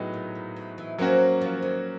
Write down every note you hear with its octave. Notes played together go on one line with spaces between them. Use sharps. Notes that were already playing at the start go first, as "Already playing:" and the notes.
Already playing: A2 F#3 B3 D#4 G#4
A#2
A#2
E3
E3
F3 F#3 A#3 C#4 F#4
F3
D#3